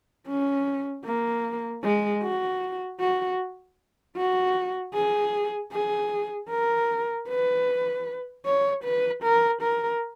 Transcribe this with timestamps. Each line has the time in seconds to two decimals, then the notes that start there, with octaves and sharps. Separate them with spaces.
0.28 C#4
1.05 A#3
1.83 G#3
2.23 F#4
3.00 F#4
4.17 F#4
4.94 G#4
5.72 G#4
6.50 A#4
7.29 B4
8.46 C#5
8.84 B4
9.23 A#4
9.62 A#4